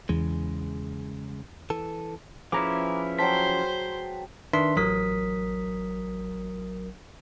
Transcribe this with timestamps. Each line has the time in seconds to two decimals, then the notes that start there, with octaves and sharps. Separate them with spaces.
0.09 E2 C#3 G#3
1.70 E3 A4
2.52 F3 C#4 E4 G#4 B4 A#5 D6
3.19 F#3 C5 G5 A5 C6 B6
4.53 D#3 D4 B4 E5 C6 B6
4.77 A1 F#3 A#4 D#6 B6